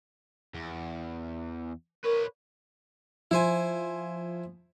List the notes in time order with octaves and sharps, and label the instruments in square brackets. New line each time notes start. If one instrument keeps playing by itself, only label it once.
[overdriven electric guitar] E2
[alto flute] A#4 [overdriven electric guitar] B4 C#5
[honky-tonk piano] F3 [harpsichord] E4 C5 G#5